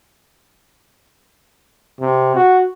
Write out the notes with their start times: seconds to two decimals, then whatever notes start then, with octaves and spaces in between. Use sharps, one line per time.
2.01 C3
2.36 F#4